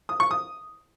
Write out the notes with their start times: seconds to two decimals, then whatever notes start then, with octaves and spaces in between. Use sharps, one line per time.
0.09 D#6
0.20 C#6
0.31 D#6